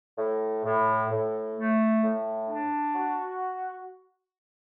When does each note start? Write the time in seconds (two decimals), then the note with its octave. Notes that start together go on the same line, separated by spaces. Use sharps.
0.18 A2
0.65 A2
1.10 A2
1.56 A3
2.03 A2
2.48 D4
2.94 F#4